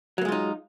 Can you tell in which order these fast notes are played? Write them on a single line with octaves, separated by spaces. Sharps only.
F#3 A#3 G#3 F4 D#4